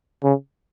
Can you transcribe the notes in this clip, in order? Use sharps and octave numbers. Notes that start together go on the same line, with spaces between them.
C#3